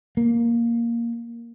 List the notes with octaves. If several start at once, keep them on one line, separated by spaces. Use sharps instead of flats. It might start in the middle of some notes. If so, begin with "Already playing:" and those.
A#3